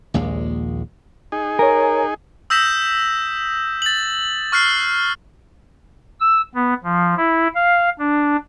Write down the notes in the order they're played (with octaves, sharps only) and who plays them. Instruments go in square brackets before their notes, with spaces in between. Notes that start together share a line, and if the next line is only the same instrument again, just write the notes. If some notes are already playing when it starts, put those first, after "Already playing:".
[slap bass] A#1 D#2 A#2 G#3
[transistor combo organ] D#4 G#4
[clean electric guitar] A#4 [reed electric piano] C#5 G#5
[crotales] D#6 E6 G6 A#6 B6 E7
A6 F#7
C#6 F6 F#6 C7
[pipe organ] E6
B3
F3
E4
F5
D4